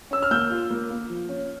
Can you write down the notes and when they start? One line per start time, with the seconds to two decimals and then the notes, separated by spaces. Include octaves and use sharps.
0.11 C#4 E6
0.23 F6
0.31 A#3 E6 G6
0.50 F4
0.70 A#3
0.90 A#3
1.10 F3
1.29 C#4